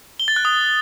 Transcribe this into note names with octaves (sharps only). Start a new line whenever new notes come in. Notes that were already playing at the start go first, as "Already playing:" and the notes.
G7
A6
F#6
D#6